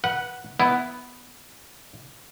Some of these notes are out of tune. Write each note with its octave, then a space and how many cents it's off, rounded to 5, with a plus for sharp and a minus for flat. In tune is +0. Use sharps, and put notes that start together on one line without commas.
B4 -20 F#5 +0
B3 +0 E4 +0